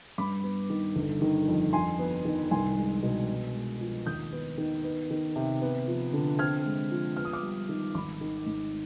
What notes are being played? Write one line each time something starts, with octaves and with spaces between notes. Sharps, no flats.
G2 B5 D6
B3
D#3
G1
D#3
F2
F2 G#5 C6
B3
D#3
C2 G#5 C6
G#3
B2
B3
G#3
F3
D#2 D#6 G6
B3
D#3
B3
D#3
C3
B3
F3
D3
C4 F6 G#6
G#3
F3
B3 F6
D#6
D6 F6
G3
D#3
G#1 B5 D6
D#3
G#2